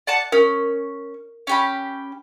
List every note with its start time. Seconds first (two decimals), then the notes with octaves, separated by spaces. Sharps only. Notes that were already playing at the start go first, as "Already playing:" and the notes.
0.07 D5 F#5 A5
0.32 C#4 A#4
1.47 C#4 G4 B5